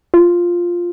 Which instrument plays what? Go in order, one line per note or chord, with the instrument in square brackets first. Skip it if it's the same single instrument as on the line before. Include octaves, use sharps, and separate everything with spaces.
[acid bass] F4